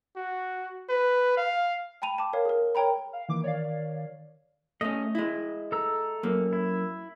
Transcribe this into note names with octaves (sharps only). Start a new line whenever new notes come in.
F#4
B4
F5
G5 A5 B5 D#7 F7
A5 D6
A#4 C#5 F5
G#4 A#4
A#4 C#5 G5 A#5 B5
F5
D#3 E3 A#3 D6
C#5 D5 F5
A3 C#4 D#5
G#3 E4
A4 A#5 E6
F#2 A#3
E4